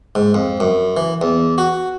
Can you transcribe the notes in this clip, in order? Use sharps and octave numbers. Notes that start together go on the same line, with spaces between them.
G#2
F2
F#2
E3
E2
F#4